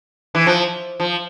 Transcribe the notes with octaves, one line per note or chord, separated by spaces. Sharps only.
E3
F3
F3